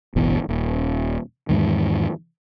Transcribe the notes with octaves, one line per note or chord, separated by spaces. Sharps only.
D1 G1 B2 E3
D#1
E2 G#2 D#3